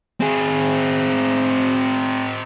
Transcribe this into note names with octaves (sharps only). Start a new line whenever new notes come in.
C4 G#4